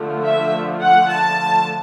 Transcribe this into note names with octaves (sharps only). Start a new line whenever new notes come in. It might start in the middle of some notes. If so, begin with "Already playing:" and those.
Already playing: D3 F3 A3
E5
F#5
A5